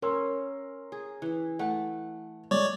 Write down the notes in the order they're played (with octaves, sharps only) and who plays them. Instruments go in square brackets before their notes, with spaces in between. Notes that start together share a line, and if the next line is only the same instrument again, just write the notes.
[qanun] C#4 [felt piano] A#4 C6 E6
[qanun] G#4
E3
[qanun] A3 A5 [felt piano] F#5
[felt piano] G#3 [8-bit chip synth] C#5 D5